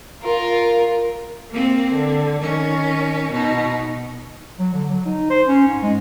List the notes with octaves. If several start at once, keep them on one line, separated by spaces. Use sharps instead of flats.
F4 A#4
A#3 C4
D3
D#3 C#4
B2 D#4
F#3
D3
F#3
D#4
C5
C#4
G#2
G#3